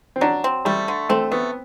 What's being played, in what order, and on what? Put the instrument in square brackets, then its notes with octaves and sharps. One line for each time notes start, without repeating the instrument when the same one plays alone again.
[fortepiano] C4
[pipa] F#3 [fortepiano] D4
[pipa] C4
[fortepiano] G3 [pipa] A3
[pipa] D3
[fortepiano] A3 [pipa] C4
[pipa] A3 [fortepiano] B3